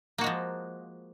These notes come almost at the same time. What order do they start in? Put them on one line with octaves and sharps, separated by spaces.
A#3 F#4 G#3 F3